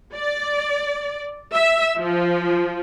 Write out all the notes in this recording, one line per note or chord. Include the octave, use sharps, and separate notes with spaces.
D5
E5
F3